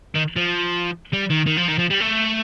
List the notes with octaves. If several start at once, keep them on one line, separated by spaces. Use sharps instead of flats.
D#3
F3
G3
D#3
D#3
F3
D#3
F3
G3
A3